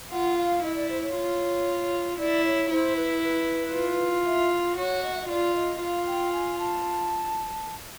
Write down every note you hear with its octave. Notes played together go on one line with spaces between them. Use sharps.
F4 F#5
F5
E4 D#5
D5
C5
C#5
F4
E4 D5
C#5
E4 C5
B4
B4
F4
E5
F#4 C#5
D#5
E5
D#5
F4 D5
D#5
F4 F5
G5
G#5
A5